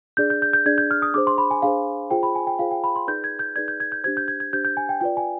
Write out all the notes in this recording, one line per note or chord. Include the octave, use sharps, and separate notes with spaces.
D4 G#4 D5 G6
G6
G6
G6
D4 G#4 D5 G#6
G6
F6
D#6
D4 G#4 C5 D6
C6
B5
G#5
D4 G#4 C5 F5
F4 G#4 C5 G5
B5
G#5
G5
F4 G#4 C5 F5
G5
B5
C6
D#4 G#4 B4 D5 G6
G#6
G6
D#4 G#4 B4 D5 G#6
G6
G#6
G6
D4 G4 C5 G#6
G6
G#6
G#6
D4 G4 C5 G6
G6
G#5
G5
F4 B4 D5 G5
G#5